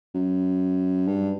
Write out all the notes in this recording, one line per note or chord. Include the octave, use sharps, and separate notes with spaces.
F#2
G2